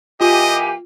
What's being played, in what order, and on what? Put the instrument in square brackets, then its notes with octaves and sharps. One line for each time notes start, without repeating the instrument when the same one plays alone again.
[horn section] E3 A#3 G4 [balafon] F4 [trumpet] D#5 [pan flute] G#5